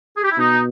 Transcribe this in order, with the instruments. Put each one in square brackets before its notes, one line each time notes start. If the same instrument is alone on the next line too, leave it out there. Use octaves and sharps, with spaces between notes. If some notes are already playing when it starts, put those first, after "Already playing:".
[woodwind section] G#4
G4
E4
[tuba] B2 [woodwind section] D#4